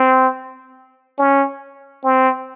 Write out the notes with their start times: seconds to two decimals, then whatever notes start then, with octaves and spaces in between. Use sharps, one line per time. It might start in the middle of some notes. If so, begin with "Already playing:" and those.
Already playing: C4
1.18 C#4
2.04 C4